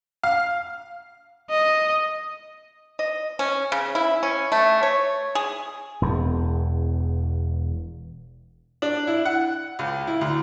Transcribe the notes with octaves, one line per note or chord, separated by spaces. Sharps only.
F5
D#5
D#5
C#4
C#3
E4
C#4
A3
C#5
G#4
E1 E2
D4
E4
F#5
C#2
E4
D2